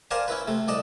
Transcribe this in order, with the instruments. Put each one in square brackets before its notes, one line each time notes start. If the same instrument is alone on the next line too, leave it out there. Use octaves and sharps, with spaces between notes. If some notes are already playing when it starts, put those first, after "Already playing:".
[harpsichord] A#4 C5 D5 F5 G#5 A5
C#4 E4 B4
C3 A3
C2 D5 D#5 A5